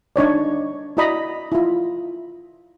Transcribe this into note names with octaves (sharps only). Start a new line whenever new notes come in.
D4 D#4 C#5 D5
E4 F#4 D5 D#5 A#5 B5
E4 F4